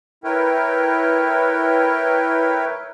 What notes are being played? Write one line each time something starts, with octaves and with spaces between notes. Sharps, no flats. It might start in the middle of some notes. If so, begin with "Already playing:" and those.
E4 A#4 B4 C#5 G5